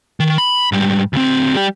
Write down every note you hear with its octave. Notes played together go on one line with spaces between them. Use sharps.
D#3
B5
G#2 G3
D2 C4
G3 G4